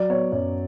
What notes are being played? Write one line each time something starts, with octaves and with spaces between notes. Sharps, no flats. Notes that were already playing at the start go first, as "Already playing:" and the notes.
Already playing: F#3 D5
B3 C#5
F#2 C#5